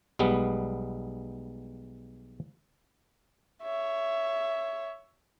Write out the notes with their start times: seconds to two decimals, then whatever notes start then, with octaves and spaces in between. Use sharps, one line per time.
0.19 B1 G3 G#3 B3
3.63 C#5 E5